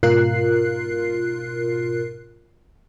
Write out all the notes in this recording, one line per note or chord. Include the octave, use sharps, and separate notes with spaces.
G#2 B2 F4 A#4 F#6 C7